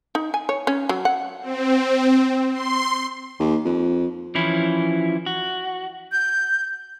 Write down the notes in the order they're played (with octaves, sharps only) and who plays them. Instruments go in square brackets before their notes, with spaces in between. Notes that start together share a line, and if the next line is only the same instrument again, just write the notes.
[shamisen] D#4
G#5
C#5
C#4
F#3
F#5
[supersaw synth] C4
C6
[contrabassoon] D#2
F2
[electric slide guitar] E3 F3 C#4 E4
F#4
[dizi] G6